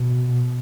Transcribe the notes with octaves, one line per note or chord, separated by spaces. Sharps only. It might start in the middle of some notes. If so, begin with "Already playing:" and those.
Already playing: B2